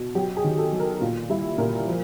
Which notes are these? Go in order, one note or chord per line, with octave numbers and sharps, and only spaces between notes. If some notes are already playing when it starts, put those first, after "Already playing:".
Already playing: B2
F#3 G4
G#4
D#3
A4
F#3
A#4
A#2 F4
G3 E4
A#2 A#4
F3